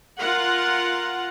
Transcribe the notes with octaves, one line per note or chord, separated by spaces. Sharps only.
F4 A#4 F#5